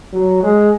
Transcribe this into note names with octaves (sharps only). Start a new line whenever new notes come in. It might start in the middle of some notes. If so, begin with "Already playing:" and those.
F#3
G#3